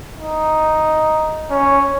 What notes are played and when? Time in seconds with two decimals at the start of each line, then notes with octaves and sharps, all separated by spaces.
0.20 D#4
1.50 C#4